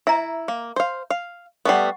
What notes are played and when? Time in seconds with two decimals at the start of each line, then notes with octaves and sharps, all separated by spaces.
0.07 E4 E5 A#5
0.48 A#3
0.76 C5 F5
1.10 F5
1.65 G3 A3 B3 F#5 C#6